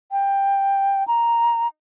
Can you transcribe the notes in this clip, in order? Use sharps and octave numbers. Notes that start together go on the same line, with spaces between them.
G5
A#5